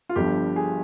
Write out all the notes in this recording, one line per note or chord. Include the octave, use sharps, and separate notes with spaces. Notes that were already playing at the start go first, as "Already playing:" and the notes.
F4
G1 G2 F3 G4
G#4